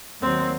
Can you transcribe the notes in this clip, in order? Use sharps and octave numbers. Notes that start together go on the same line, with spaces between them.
D#2 D#3 F#3 C4